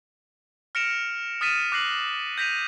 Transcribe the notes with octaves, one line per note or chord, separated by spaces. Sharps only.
F6 A#6 C#7 D7 E7 F7
D#6 F6 A6 B6 D#7 E7
D6 F#6 A#6 C7 F#7
G6 A#6 B6 D#7 F7